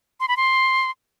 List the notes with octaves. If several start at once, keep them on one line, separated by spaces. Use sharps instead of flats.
C6
B5
C6